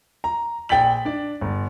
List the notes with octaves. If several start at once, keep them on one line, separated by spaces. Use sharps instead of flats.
A#5
A#1 G5 A6 B6 F#7
D4 D5
G1